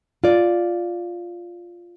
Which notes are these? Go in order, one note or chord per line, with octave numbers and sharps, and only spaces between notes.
F4 D5